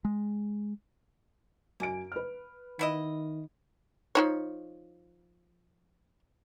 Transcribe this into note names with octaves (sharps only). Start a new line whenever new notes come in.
G#3
F#2 A#3 G#5 D7
B4 F6
D#3 B3 E4 D#5
F3 D#4 C#5